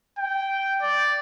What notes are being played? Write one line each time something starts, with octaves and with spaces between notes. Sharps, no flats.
G5
D5